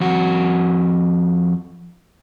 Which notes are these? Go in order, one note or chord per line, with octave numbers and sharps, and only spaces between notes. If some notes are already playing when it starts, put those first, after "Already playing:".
F2 F#4